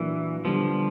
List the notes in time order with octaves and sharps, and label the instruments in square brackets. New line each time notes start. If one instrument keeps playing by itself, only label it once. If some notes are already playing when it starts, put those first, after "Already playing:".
Already playing: [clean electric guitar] A#2 F#3 A#3 D4 [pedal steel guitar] E3
[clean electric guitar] D3 G3 B3 [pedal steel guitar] F3